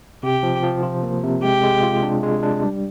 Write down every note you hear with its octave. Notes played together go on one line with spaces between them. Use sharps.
C3 G4
F3
F3
F4
A#3
C3
G#3 G4
G#3
F4
D4
G#3
D4
G3